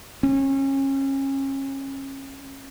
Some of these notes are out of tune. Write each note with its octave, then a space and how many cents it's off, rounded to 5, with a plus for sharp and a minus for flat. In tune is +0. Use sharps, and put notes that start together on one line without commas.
C#4 -30